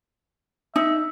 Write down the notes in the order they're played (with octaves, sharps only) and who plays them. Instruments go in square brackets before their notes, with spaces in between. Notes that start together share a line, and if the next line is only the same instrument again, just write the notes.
[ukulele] D#4 [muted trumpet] E5